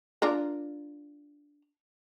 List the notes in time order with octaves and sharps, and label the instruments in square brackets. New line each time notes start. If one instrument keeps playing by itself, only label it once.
[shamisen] D4 F4 A#4